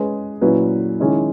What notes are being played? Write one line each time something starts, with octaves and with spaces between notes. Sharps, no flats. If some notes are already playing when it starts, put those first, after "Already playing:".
Already playing: G#3 C#4 G#4 B4
A#2 F#3 C#4 E4 B4
D#3 G#3 C#4 E4